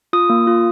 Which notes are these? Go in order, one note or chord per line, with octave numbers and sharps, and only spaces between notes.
F4 D#6
A#3
F4